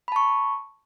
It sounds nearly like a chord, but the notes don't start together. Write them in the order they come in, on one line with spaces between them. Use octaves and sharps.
B5 A5 C#6